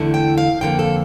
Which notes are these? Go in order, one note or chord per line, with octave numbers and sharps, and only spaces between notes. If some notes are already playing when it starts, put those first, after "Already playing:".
Already playing: E2 D3 A3 E4
G5
F5
F2 D3 F3 A#3 G5
A4